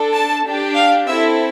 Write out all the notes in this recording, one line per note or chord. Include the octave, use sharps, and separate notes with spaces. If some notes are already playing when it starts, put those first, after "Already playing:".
Already playing: D4 A4
A5
D4 G4
F5
C4 E4 A4 E5